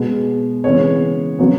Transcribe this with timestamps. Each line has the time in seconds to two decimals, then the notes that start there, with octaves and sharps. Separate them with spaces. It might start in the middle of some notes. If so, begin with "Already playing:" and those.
Already playing: B2 G#3 B3
0.64 C#3 E3 G#3 B3 C#5
1.39 C#3 F#3 B3